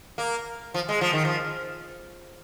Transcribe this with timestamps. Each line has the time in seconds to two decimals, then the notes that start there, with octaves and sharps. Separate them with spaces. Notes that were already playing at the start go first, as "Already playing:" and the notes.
0.18 A#3
0.74 F3
0.89 G#3
1.01 F3
1.13 D#3
1.25 F3